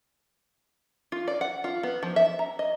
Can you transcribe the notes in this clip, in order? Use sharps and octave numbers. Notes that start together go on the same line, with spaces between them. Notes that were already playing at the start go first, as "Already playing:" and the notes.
F4
D5
F#5
F4
B3
F3
E5
A#5
D#5